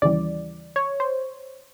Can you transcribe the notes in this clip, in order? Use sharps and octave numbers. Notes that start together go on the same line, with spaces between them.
D#2 C#3 E3 G3 D5
C#5
C5